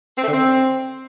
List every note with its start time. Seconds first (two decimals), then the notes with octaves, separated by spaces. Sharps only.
0.18 C4
0.23 A3
0.28 D3
0.33 C4